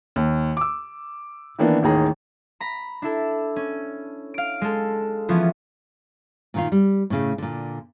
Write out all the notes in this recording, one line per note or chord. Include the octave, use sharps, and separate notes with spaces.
D#2
D6 E6
D#3 E3 A#3 B3 D4
A1 D#2 D#3 G#4 A#5
A#5 B5
D4 E4 A4
C#4
F5 D7
G#3 A4
E3 F3 B3 C#4 F4
A#2 D#3 F4
G3
A2 C#3 A3
A#2 D3